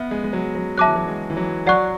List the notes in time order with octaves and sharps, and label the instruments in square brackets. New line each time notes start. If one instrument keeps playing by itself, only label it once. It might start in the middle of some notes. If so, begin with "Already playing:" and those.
Already playing: [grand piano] B3 [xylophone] B4 E5
[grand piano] G#3
G#3
F#3
F#3
[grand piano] F#3 [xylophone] E5 A5 D6 F#6
[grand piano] E3
F#3
G#3
E3
F#3
[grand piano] F#3 [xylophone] D5 F#5 C#6 F#6